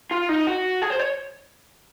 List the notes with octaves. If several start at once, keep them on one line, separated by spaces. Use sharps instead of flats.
F4
D#4
F#4
G#4
C5
C#5